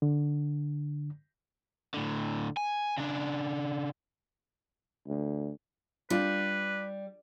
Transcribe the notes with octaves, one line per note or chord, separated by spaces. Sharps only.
D3
A2 D3
G#5
C#3 D4
D2
G3 D4 F4 B4